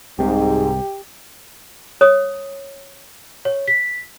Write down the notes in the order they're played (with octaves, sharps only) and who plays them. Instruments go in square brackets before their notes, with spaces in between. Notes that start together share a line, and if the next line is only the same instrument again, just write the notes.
[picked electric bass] C2 C3 [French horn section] G#2 [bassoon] G4
[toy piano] C#5 D#6
[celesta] C#5
B6